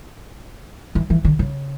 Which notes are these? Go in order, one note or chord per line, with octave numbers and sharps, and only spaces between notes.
E3
E3
D3
C#3